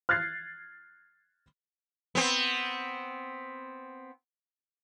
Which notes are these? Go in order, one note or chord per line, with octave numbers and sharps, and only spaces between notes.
F6 F#6 G#6 A6 C7
B3 C4